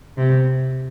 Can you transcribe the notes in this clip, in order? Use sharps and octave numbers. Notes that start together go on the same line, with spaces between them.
C3